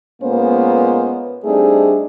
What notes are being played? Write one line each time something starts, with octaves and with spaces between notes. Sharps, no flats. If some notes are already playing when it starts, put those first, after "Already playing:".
A#2 G#3 A#3 B3 C#4 C5
G3 A3 C4 D4 D#4 G#4